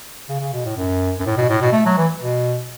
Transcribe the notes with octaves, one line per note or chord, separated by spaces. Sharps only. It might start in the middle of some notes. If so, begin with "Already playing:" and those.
C#3
C#3
B2
A2
F#2
F#2
A2
B2
A2
B2
A3
F#3
E3
B2